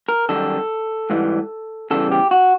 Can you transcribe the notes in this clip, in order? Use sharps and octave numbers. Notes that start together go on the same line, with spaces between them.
A#4
F#2 D#3 G3 A4
G#2 E3 G3
E2 C#3 E3 G3 A4
G4
F#4